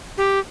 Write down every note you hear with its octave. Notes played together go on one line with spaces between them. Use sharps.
G4